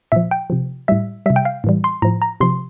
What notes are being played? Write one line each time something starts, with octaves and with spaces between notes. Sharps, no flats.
A#2 F3 E5
G5
C3 F3
A2 G3 E5
C3 G3 E5
G5
F5
A2 E3 G3
C6
A2 F3 A#5
A#5
C3 F3 C6